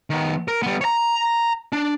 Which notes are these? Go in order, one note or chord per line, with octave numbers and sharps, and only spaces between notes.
D#3 B3
A#4
G3 B3
C#5 A#5
D4